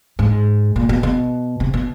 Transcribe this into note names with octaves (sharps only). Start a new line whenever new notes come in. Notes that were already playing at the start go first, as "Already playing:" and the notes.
G#2
A#2
B2
B2
C3
B2